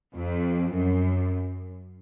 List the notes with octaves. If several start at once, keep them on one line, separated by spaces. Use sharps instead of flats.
F2
F#2